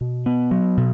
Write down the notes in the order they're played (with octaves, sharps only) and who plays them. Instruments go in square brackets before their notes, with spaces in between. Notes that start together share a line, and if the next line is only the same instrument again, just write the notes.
[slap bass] B2
B3
F#3
B2